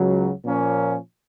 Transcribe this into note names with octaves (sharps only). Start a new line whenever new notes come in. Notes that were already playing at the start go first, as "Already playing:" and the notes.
Already playing: C#2 C#3 F#3
A#2 F3 A#3 C#4